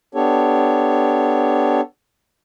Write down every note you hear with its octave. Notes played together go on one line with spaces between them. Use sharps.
B3 D4 G4 A4 C#5